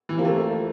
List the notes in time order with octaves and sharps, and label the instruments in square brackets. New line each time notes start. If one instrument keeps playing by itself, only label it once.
[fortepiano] E3
[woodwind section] C3 F3 [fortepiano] A#3
[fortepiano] A3
[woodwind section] F2